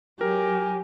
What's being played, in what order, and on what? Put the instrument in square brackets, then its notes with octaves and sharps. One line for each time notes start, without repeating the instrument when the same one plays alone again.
[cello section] F#3 [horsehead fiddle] G4 [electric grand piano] A#4 [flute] G#5